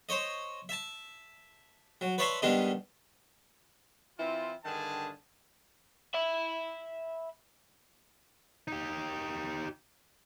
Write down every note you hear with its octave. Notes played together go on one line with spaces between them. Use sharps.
C5 C#5 D#5
E5 A5
F#3
B4 C#5 D5 E5 A5 C6
D#3 G3 G#3 B3 D4 D#4
E3 C4 E4 F4
G2 D3 D#3 G#4 A5
E5 B5
D#4 G4